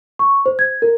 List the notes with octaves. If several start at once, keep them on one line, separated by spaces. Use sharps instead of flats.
C#6
C5
G#6
A#4